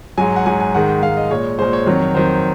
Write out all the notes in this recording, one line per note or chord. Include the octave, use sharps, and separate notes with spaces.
G#2 F#3 G#5
F#5
G#2 F#3 G#5
G#5
G#2 D#3 G#3 F#5
G#2 D#3 G#3 F5
D#5
A#2 G#3 C#5
A#2 G#3 C5
C#5
F2 D#3 F#3
F2 D#3 F#3 C5